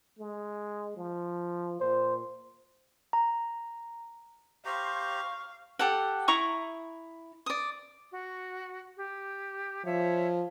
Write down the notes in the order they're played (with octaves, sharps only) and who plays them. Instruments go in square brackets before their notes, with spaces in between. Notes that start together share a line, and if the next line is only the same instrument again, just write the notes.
[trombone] G#3
F3
[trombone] A#2 [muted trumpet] C5
[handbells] A#5
[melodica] G4 A#5 [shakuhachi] C5 [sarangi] F5 [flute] C#6
[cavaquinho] G4 A4 F#5
E4 A#5 C#6 D#6
D5 D#6
[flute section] F#4
G4
[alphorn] F3 [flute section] C#5 E5